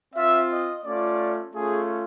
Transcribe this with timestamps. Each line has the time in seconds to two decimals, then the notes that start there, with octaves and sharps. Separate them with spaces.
0.14 C4 F4 E5
0.49 D#5
0.84 A3 C#4 F4 D5
1.54 A3 C#4 F4 G#4